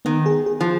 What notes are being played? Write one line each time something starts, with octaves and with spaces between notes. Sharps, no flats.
D#3 B3
G#4
G#4
F3